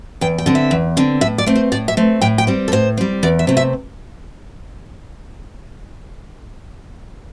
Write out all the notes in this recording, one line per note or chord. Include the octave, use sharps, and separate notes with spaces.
E2 G5
G5
D3 C4
E5
E2
D3 C4
A2 E5
D5
A3 C4
C5
A2 D5
E5
A3 C4
A2 G5
G5
G3 C4
A4
A2 C5
G3 C4
E2 D5
E5
C3 A3 C4
E5